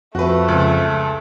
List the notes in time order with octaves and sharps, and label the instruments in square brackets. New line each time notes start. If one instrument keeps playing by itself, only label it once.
[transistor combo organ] F2 [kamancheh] A3 A4 [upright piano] F#4 B4
[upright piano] C#2